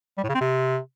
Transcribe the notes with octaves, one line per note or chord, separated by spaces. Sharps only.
G3
A2
C#3
C4
C3